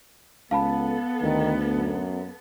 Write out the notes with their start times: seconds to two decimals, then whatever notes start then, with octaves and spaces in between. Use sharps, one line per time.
0.51 C#2 B3 A4 F5 A5 B5
1.23 D2 D#3
1.72 F#2